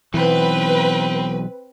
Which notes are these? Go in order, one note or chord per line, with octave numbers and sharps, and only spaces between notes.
B1 E3 C4 B4